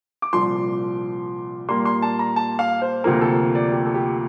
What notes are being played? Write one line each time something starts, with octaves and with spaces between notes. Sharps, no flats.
D6
C2 A#2 F3 C6
A#2 G3 A#3 C6
C6
A5
A#5
A5
F5
C5
D2 C3 F3 A#3 A#4
A4
D5
G4
A4
G4